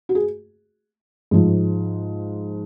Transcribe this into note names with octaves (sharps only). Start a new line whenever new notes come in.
F#4
G#4
G#2 F3